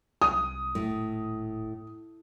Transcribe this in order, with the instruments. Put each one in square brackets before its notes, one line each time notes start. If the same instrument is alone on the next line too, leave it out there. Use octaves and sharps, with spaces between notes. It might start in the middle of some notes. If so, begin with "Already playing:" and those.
[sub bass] C2 [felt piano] D#6
[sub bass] D#1 [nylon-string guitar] A2